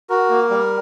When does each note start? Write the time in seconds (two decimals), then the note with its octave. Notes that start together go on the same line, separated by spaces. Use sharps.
0.10 F#4 A#4
0.30 A#3
0.50 G3